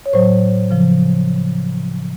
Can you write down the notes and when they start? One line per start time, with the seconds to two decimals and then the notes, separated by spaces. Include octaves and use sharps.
0.06 C#5
0.13 A2 F#3 C5
0.71 C#3 F3